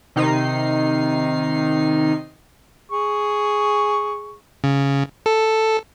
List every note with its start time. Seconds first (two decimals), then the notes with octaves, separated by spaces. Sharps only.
0.16 C3 D#3 D#4 C7
2.91 G#4 C#6
4.64 C#3
5.26 A4